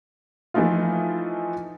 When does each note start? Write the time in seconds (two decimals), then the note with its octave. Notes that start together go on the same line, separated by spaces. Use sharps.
0.54 E3 F3 A3 D#4 F4